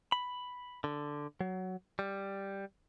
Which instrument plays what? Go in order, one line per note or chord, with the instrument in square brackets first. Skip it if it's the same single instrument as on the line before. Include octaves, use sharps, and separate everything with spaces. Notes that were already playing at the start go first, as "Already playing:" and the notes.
[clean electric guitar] B5
D3
F#3
G3